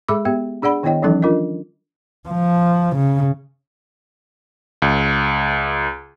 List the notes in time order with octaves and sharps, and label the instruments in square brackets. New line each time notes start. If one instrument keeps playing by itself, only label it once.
[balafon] G#3 G#4 A4 E5 B5 D6
B3 G4 E5
D4 G#4 D5 F#5 B5
D#3 B3 E4 C#5 D#5 G5
E3 F3 G3 C#4 D#4 A4
D4 F4 A#4 D#5
[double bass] F3
C#3
[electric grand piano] C#2